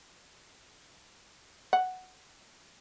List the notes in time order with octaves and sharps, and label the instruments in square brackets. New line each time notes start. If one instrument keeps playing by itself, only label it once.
[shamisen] F#5